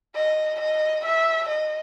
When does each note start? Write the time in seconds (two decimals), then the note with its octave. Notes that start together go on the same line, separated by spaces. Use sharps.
0.15 D#5
0.60 D#5
1.05 E5
1.49 D#5